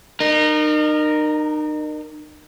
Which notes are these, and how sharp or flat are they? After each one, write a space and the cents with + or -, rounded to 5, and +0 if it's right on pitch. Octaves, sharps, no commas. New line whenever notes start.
D#4 -35 A#4 +0